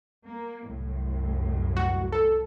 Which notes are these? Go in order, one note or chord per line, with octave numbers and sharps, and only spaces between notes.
A#3
C2 F#2 A2
F#4
A4